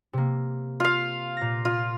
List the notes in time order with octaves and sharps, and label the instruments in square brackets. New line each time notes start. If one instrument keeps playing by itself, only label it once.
[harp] C3 A#3
[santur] F4 F5
[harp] A#2 A#6
[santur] F4